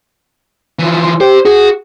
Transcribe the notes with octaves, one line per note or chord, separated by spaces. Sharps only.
E3 F3
C6
G4 C5
F#4 G#4